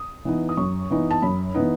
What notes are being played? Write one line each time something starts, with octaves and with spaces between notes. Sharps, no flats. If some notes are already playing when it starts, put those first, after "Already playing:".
Already playing: D#6
E3 B3 D#4
D#6
F#2 C#6
E3 B3 D#4
A5
F#2 B5
E3 B3 D#4